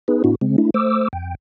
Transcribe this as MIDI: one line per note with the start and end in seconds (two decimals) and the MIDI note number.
0.08 0.23 59
0.08 0.23 63
0.08 0.23 68
0.08 0.23 71
0.24 0.35 45
0.24 0.35 59
0.24 0.35 62
0.24 0.35 64
0.24 0.35 66
0.41 0.56 49
0.41 0.56 56
0.41 0.56 60
0.58 0.70 57
0.58 0.70 62
0.58 0.70 64
0.74 1.08 57
0.74 1.08 72
0.74 1.08 86
0.74 1.08 88
1.13 1.35 41
1.13 1.35 79